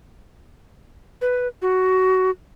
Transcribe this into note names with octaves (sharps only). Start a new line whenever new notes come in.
B4
F#4